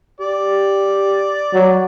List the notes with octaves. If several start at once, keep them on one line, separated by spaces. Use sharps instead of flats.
G4 D5
F#3